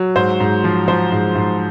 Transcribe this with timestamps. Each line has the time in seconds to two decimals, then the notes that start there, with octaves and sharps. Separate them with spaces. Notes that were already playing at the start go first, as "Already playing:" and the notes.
Already playing: F#3
0.15 G#2 C5
0.40 G#2
0.64 F3
0.88 F3 C5
1.12 G#2
1.35 G#2